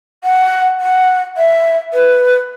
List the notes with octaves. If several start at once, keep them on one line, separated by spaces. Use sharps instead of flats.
F#5
F#5
E5
B4